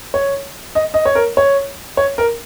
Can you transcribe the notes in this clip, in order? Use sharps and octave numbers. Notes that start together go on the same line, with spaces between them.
C#5
D#5
D#5
C#5
A#4
C#5
C#5
A#4